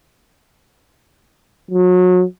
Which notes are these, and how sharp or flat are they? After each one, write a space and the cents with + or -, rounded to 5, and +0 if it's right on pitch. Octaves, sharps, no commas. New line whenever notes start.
F#3 -30